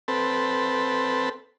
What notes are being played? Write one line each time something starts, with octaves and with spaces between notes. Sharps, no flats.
C4 A4 B4